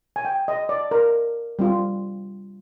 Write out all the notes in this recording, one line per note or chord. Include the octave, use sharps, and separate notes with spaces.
G#5
G5
D#5
D5
A#4
G3 C4 F4